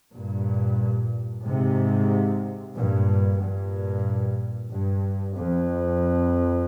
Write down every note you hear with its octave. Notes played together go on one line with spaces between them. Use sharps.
G2 A#2
G#2 C3
G2 A#2
G2 A#2
G2
F2